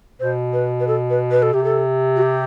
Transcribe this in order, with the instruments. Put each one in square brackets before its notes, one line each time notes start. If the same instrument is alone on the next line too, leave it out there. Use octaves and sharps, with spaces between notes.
[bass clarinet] B2 [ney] C5
[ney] B4
B4
A4
B4
B4
A4
[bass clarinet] C3 [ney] G4
[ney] A4
F#4
G4